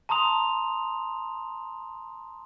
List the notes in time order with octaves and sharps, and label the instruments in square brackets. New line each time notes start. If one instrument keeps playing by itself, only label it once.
[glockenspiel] A5 A#5 C6 D#6 F7